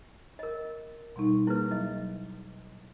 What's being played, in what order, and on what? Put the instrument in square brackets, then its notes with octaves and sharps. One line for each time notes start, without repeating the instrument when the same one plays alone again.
[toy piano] A#4 D#5
[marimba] B2 G3 D#4
[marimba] A#3 G#4 A#4 [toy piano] E4 B4
[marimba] F#3 [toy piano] D#5